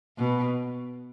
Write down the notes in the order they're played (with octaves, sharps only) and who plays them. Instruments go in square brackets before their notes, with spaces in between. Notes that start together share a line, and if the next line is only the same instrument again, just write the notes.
[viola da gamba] B2